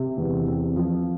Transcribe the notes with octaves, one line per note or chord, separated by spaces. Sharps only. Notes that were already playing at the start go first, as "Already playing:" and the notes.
Already playing: C3
E2
C4
F3